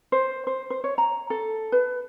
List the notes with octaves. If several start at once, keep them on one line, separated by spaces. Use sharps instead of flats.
C5
C5
C5
C#5
A#5
A4
B4